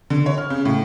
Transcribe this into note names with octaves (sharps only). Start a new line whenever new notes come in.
D3
C#5
F6
C#3
A2